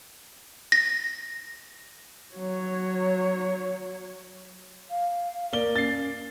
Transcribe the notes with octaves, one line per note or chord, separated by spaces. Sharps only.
A#6
F#3 C#5
F5
A#3 D5 G7
C#4 A6 C7